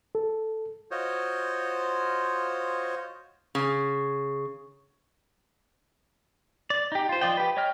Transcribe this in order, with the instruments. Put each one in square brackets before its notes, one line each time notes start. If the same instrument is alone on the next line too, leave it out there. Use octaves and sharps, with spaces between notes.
[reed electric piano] A4
[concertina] F4 F#4 C5 C#5 D#5
[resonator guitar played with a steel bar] C#3
[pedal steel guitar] D5
D#4 G4
F4 C5
F3 F4 D5 D#5 G5
G4 B4
C#5 D#5 G5 F6